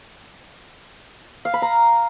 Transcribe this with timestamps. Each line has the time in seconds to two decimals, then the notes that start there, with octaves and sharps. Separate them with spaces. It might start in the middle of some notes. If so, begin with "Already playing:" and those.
1.45 F5
1.54 B5
1.62 A#5